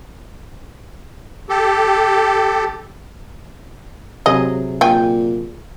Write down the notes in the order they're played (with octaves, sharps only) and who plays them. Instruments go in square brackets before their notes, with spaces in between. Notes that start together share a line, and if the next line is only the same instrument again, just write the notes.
[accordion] G4 A4
[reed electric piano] C3 F#3 G#4 [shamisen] D#5
[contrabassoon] A#2 [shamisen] G5 G#5